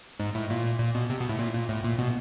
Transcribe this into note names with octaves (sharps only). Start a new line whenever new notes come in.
G#2
A2
A#2
A#2
B2
C3
B2
A2
A#2
A#2
A2
A#2
B2